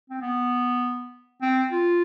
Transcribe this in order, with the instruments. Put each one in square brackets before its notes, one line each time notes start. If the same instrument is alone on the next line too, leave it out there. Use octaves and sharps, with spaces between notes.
[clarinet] C4
B3
C4
F4